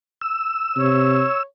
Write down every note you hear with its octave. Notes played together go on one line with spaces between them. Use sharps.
E6
C3 C#5